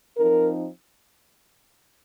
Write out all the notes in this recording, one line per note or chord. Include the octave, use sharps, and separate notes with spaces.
F3 C4 D#4 A#4